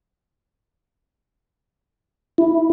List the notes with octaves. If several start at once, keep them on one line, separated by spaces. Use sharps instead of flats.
E4